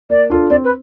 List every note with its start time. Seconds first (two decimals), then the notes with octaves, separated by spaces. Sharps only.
0.10 A#3 D5
0.30 D4 F4 A4
0.50 C4 D5
0.64 B4